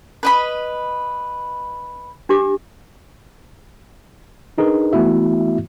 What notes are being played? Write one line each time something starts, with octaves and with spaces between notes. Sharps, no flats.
B4 D#5 B5
D4 G4 D6
D4 D#4 G#4 A#4 B4
E3 A3 B3 E4 F#4 E5